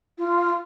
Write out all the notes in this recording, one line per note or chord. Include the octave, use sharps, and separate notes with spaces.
F4